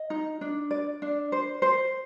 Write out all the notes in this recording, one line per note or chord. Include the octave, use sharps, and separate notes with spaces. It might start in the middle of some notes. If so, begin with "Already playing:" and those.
Already playing: D#5
D#4
D4
D5
D4
C5
C5